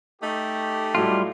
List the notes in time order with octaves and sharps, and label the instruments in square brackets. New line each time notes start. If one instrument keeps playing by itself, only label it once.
[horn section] A3 D#4 G4
[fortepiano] A2 F#3 E4 [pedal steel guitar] G3 F4